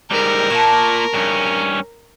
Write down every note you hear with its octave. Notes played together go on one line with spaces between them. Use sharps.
G#2 G3 A#4
A#2 A#3 A5 C#6
G2 C#4